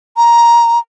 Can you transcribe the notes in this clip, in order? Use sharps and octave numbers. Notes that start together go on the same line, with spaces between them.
A#5